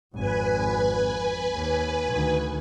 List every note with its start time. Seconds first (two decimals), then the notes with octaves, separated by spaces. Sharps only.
0.14 G#1 F2 B4 G#5
1.53 D#2
2.12 D2 D#3